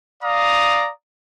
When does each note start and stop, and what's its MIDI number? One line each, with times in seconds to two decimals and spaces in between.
0.23 0.90 74
0.23 0.90 77
0.23 0.90 82
0.23 0.90 87